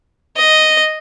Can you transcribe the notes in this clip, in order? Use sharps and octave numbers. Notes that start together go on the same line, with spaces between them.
D#5